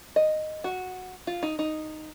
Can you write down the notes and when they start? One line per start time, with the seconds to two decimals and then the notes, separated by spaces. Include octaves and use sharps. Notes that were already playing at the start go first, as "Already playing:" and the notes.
0.16 D#5
0.64 F#4
1.27 F4
1.43 D#4
1.59 D#4